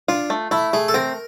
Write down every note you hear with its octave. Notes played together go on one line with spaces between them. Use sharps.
D4 F4
A3
A3 E4
A3 G#4
A4
C4 A#4